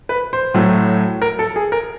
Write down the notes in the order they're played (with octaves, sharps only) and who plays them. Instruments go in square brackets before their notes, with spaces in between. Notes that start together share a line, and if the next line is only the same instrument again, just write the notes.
[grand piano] B4
C5
[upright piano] A2 F#3 A3
[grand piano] A#4
A4
G#4
A#4